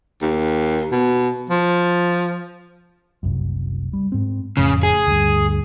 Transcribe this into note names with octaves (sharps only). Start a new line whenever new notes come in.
D#2
B2
F3
F#1 C2 F#2
G3
G#2 C4
F#1 F2 A2 C#3
G#4
D2 G2